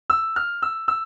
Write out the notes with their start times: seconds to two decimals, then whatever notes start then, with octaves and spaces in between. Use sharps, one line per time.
0.10 E6
0.36 F6
0.62 E6
0.88 E6